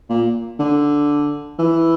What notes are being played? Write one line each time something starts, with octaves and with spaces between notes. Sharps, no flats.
A#2
D3
E3